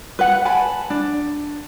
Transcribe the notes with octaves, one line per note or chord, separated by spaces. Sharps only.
B4 F#5
G#5 A5 B5
D4